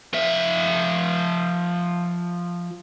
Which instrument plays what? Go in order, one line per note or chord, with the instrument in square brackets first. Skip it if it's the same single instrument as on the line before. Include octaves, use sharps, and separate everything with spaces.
[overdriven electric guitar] F3 E5